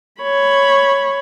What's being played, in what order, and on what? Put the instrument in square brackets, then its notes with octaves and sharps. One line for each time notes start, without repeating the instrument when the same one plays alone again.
[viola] C#5 B5